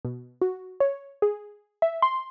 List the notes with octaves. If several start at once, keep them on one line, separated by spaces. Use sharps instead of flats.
B2
F#4
C#5
G#4
E5
C6